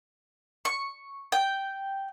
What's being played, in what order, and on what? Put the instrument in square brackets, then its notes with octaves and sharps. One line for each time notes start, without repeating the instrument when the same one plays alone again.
[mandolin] C#6
G5